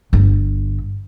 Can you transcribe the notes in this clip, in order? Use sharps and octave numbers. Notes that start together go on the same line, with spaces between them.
G1